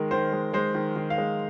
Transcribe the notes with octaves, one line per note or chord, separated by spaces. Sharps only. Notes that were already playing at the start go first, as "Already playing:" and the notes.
Already playing: D#3 G#3 A#4
D#3 C5
G#3
G#3 C5
D#3
D#3
F5
G#3